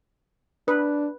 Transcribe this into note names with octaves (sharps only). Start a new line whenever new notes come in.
D4 B4